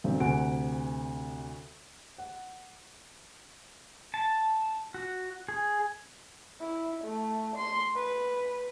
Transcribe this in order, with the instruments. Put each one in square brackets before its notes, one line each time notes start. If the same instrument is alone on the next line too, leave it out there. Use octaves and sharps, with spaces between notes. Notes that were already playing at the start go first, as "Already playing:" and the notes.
[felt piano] B1 G2 D3 C4
D2 C3 F#5 G#5 D7
F#5
[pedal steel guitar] A5
F#4
G#4
[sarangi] E4
A3
C6
B4